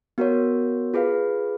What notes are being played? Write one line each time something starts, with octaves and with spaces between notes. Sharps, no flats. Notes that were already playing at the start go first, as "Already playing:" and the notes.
B3 F#4 A#4 C#5
F4 G#4 B4 F5